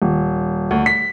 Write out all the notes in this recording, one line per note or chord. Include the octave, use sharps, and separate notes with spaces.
D#1
D2
B6